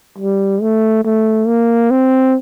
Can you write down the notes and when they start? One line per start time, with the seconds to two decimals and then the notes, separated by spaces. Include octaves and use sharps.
0.18 G3
0.61 A3
1.05 A3
1.47 A#3
1.91 C4